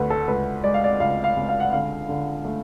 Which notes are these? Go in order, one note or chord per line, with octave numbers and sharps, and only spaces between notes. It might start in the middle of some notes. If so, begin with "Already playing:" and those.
Already playing: D2 A3 B4
A4
C#2 B4
G#3 D5
F5
D5
C#2 F5
F5
C#2
F5
F#5
D3 F5
D3
A3